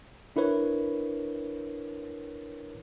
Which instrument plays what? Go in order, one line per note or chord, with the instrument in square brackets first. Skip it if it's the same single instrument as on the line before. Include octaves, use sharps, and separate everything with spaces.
[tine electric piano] D4 E4 A#4 B4 C#5